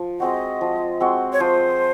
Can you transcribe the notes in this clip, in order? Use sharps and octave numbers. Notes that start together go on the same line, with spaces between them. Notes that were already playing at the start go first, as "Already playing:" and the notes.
Already playing: F3
G#3 C4 F#4 D#5
F3
G#3 C4 F#4
C#5
F3 C5